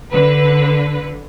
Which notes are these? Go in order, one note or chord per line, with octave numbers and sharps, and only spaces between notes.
D3 B4